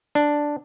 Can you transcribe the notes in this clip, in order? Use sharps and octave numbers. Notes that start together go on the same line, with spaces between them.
D4